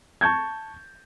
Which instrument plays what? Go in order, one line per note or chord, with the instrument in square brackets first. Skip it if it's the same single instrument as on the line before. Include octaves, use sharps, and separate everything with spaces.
[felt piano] A5 C#6 G6 G#6